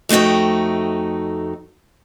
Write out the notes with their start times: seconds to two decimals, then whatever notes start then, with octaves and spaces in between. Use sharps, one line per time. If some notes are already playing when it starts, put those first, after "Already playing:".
0.09 F2 A3 D#4 F#4 G5